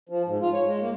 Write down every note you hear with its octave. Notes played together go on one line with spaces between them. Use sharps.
F3
G#2
F4
C#5
G#3
A#3